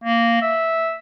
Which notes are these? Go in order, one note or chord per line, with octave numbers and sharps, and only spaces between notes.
A#3
E5